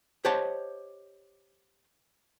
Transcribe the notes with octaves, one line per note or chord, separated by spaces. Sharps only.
G4 C5 C#5 D#5 F#5 A5